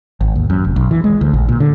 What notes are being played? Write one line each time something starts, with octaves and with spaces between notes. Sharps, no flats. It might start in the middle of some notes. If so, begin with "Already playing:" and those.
G#1
D#2
F#2
F1
B1
E3
G#3
D2
A#1
A#2
D3